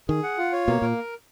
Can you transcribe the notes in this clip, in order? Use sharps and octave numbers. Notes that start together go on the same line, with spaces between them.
D#3 G#4
F#5
F4
C#5
B2 A#3
A#2 A#4